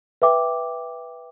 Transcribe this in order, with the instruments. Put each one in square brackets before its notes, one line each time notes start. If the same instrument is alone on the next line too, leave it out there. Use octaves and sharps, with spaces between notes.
[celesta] B4 E5 G5 D6